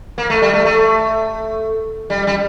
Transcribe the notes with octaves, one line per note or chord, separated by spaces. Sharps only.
A#3
A3
G3
A3
A3
G3
G3